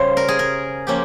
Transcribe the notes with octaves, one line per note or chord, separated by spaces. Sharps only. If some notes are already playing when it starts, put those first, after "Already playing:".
Already playing: C#3 G3 C#4 C5 F5
A#4
G#4
A#4
F3 A#3 C#4 G4